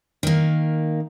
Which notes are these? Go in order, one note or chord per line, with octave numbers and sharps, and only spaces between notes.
D#3 A#3